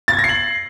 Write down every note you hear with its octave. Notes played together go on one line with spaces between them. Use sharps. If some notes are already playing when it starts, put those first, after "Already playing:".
A6
G#6
A#6
C7
F#7